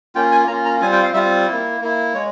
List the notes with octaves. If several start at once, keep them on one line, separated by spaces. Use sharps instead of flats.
A#3 C#4 F4 G5
G#5
A#3 C#4 F4 A#5
A#5
G3 C4 F4 G#5
G5
F5
G3 C4 F4 E5
A#3 E4
A#3 E4
G#3 C#5